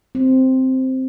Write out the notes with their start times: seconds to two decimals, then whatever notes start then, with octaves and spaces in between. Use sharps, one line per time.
0.15 C4